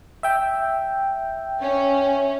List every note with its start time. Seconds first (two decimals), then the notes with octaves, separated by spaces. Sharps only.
0.23 E5 G5
1.61 C#4